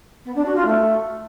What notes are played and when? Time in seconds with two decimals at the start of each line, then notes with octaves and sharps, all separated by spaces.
0.25 B3
0.35 D4
0.45 F#4
0.55 F4
0.66 A3